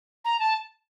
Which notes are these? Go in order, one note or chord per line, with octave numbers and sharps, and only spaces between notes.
A#5
A5